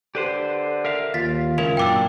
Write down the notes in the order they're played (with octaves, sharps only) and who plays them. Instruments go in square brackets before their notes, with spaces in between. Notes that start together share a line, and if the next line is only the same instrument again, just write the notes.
[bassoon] D3 [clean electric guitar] G4 B4 C5
[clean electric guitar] A#4 E5 F5
[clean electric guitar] D#2 [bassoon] F4 [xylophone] A6 B6
[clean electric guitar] C#2 C#4 E4 [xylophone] A#4 F7
[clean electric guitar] F#2 A#2 D4 [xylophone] G5 D6 E6